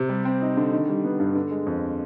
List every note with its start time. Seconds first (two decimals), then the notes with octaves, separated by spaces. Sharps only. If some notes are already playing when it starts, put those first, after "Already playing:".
Already playing: C3
0.09 G3
0.25 C4
0.42 D#4
0.57 D3
0.72 D#3
0.89 G3
1.04 B3
1.20 G2
1.35 D3
1.51 G#3
1.66 F2